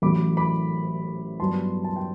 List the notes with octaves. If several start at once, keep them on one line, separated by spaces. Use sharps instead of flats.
A1 A2 F#3 B5 D6
B5 D6
G2 F#3 B3 A5 C6
A5
G5